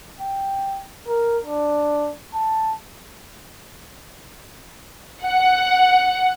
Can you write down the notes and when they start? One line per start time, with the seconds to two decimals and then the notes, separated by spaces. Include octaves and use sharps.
0.20 G5
1.08 A#4
1.45 D4
2.34 A5
5.25 F#5